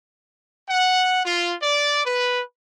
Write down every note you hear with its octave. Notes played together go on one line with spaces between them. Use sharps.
F#5
F4
D5
B4